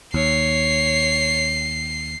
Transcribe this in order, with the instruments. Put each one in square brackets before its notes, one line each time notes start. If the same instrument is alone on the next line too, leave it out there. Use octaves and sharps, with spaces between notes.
[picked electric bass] D#2 [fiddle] C#5 [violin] C7